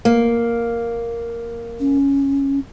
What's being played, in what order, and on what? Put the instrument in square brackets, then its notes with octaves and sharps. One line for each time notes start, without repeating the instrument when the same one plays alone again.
[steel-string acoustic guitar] A#3
[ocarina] C#4